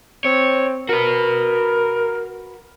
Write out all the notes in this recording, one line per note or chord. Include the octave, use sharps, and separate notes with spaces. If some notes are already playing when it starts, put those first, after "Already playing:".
C4 C#5
F#4 A#4 B4